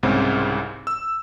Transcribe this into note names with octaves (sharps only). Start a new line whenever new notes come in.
C2 G#2 C#3 C4
E6